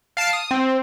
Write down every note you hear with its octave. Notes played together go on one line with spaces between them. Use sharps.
F5 A5 C7 D7
D#6
C4